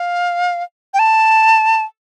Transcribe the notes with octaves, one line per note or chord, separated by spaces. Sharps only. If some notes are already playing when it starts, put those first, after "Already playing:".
Already playing: F5
G5
A5